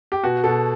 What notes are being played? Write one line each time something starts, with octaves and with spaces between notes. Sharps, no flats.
G4
B2 F#4
B2 A4